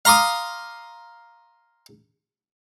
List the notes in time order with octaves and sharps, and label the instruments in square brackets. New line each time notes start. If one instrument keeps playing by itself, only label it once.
[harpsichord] F5 A#5 C6 D6 D#6